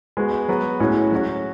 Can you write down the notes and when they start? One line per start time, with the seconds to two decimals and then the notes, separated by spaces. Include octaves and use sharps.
0.17 G#3 B3 F#4
0.48 F#3 B3 F#4
0.80 A2 G#3 C#4 F#4
1.12 F#3 C#4 F#4